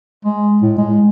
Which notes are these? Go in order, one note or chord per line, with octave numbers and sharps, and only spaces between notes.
G#3
A2
G#3